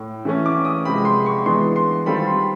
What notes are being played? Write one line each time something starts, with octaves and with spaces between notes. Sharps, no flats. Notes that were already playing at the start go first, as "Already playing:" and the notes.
Already playing: A2
E3 A3 C#4
D6
D#6
C3 F3 G#3 B5
B5
C6
C#6
E3 G#3 B3 D4 C6
C6
D#3 G3 C4 F4 A4 B5
C6